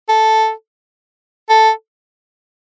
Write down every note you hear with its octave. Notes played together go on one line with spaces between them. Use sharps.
A4
A4